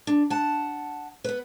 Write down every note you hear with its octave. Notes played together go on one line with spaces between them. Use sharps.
D4
F#5 A5
B3 B4